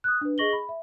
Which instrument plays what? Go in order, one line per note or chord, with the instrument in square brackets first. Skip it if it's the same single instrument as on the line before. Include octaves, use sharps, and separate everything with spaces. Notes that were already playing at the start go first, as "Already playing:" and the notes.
[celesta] D#6 F#6
D4 B4
G#4 D#5 C#6 A#6 F#7 G7
B5
E5